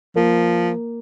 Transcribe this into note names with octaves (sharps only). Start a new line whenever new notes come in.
F3 A#3